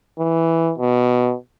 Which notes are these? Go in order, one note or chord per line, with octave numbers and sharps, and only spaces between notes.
E3
B2